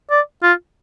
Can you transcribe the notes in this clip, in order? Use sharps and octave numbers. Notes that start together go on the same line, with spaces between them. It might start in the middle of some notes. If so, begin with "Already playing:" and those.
D5
F4